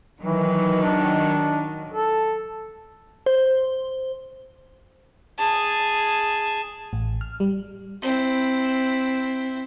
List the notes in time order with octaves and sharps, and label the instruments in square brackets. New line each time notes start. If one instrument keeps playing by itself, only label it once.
[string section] D#3 F#3 [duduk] E3
[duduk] D4
A4
[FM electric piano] C5
[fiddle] G#4 A5
[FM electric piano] A1
F6
G3
[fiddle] C4 E4